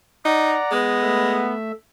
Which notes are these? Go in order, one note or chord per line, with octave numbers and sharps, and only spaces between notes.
D#4 D5 F#5 A#5
G#3 B3
A3 E5